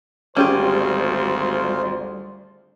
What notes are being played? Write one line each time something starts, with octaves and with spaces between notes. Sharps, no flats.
G#1 D2 G3 C#4 F4 G4 G#4 C5